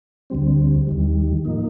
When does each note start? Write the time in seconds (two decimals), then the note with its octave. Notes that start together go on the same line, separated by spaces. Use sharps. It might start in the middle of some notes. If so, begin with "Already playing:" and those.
0.30 D2 D3 G3 C4
0.87 D#2 D#3 G3
1.44 A2 F3 A#3 D#4